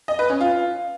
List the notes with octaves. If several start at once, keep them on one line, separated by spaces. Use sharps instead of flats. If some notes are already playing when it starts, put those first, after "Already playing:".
D#5
B4
C#4
F4